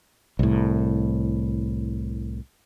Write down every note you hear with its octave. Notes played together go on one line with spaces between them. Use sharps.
C2 A2